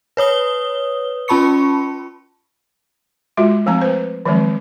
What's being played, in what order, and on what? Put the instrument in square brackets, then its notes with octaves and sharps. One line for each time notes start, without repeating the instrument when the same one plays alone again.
[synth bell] B4 C#5 D#6 G7
C#4 F4 A5 B5 C#6 C#7
[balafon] G#3 F4 F#4
F3 A3 C4 A#5
B4 C5
D#3 F3 F#3 G#3 C4